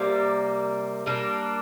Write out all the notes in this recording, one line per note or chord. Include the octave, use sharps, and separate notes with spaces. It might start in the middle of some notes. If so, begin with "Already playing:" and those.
Already playing: C3 G3 A#3
G3 A#3 D4